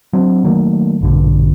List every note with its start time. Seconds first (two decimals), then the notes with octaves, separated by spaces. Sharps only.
0.13 F#3 C4 D4
0.44 D#3 F#3 A3 A#3
1.01 A#1 G2 B2 D3